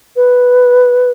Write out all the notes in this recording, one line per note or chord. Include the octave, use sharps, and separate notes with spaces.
B4